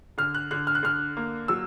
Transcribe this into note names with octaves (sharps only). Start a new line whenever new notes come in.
D3 F6
F#6
D3 F#6
F6
F#6
D3 F6
A#3
F#3 E6